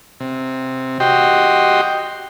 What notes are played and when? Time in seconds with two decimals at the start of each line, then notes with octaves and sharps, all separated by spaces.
0.20 C3
1.00 F#4 G4 D#5 G5 C6